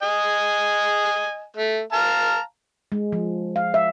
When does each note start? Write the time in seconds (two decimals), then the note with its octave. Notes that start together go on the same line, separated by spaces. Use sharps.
0.03 D#5 G#5
1.57 A3
1.93 F5 A5 A#5
2.92 G#3
3.12 F3
3.56 F5
3.74 E5